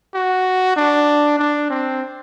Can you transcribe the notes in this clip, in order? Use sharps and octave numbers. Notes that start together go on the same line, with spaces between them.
F#4
D4
D4
C4